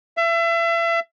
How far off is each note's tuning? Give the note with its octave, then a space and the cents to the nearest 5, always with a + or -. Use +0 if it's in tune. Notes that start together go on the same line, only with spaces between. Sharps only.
E5 +35